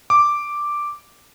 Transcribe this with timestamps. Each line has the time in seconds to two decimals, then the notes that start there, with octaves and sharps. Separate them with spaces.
0.10 D6